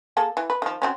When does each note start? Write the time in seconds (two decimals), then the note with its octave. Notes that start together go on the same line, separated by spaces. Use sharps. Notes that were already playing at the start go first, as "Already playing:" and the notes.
0.17 A#3 G#4 A4
0.37 E3
0.50 B4
0.62 D#3 F3
0.82 F#3 C4 C#4